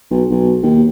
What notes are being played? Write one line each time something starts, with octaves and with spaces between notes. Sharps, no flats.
B1
B1
D#2